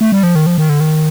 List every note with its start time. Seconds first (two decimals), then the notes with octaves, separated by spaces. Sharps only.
0.01 A3
0.12 G3
0.23 F3
0.35 D#3
0.46 F3
0.58 D#3
0.69 D3
0.80 D#3